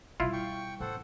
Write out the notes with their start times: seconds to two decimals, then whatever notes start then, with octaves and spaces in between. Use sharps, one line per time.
0.20 B2 G3 E4 F4
0.33 G5 C#6
0.80 A1 A4 C5 F#5